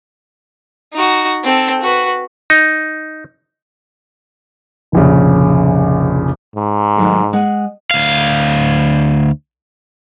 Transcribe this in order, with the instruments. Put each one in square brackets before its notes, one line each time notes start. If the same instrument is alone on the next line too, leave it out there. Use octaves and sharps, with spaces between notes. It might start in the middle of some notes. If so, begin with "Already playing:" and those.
[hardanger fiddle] D#4 F#4
C4 A4
F#4 B4
[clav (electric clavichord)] D#4
[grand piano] F1 A#1 C#3
[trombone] G#2
[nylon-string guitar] D#3 F#3 A3
G#3 G#4 F#5
[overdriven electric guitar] D2 F5